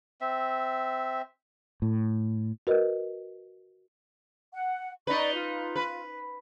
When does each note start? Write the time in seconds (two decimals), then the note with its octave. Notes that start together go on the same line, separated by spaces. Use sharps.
0.21 C4 E5
1.82 A2
2.67 F#4 A#4 B4 D#5
4.53 F#5
5.07 D#4 B4 D5 D#5 C#6
5.35 F4
5.76 B4